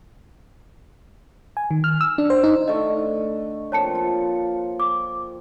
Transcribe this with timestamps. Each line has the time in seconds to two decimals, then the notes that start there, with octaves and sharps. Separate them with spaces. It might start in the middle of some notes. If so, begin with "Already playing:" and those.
1.57 G#5
1.71 D#3
1.84 F6
2.01 E6
2.18 D4
2.30 C5
2.44 D#4
2.68 D3 A3 D#5
3.72 F3 A#3 C4 C#5 A5 C#7
3.91 C4 F4
4.80 D6